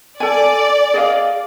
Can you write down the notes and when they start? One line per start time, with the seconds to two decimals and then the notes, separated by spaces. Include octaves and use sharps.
0.20 A4 D5 G#5
0.94 G#4 D#5 F5